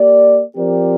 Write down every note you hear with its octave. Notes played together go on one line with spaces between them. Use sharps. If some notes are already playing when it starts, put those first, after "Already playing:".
Already playing: A#3 G4 D5
F3 C4 G4 A#4 D5